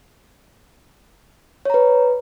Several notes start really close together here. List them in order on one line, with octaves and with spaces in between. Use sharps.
C#5 A#5 B4